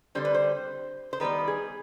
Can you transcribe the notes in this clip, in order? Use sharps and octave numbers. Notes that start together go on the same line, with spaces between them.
D3 G3 C4 C5
B4
C5
C5
D#3 G3 B3 B4
G#4